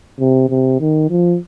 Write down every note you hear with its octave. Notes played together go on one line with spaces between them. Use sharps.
C3
C3
D#3
F3